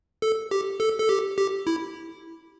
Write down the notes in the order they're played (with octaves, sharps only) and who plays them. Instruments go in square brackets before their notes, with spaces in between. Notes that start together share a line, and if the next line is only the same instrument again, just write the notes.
[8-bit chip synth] A4
G4
A4
A4
G4
G4
E4